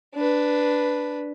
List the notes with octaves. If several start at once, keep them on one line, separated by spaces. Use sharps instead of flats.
D4 B4